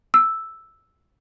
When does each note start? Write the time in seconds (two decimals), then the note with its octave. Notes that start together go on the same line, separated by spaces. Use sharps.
0.14 E6